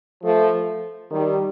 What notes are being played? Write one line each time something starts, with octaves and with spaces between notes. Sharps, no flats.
F3 A3
D#3 G3